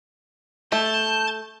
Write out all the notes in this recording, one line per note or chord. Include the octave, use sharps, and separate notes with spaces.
A3 A5 G6